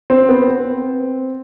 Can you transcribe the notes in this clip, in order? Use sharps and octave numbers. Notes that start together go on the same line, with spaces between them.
C4
B3
C4